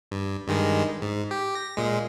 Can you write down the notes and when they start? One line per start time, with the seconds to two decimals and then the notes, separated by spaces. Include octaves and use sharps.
0.12 G2
0.48 G2 D#3 G#3
1.02 G#2
1.31 G4
1.55 A#6
1.77 A#2 G#3